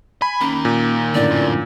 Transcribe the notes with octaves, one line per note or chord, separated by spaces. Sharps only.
G#5 B5
D#3 A#3 C#4
A#2
F#2 A2 D3 D5
F2